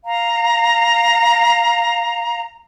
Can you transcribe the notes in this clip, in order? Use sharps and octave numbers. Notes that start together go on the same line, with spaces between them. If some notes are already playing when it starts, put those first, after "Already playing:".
F5 A#5